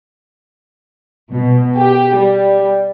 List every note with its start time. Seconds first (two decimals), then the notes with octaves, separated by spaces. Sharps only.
1.31 B2
1.77 G4
2.16 G3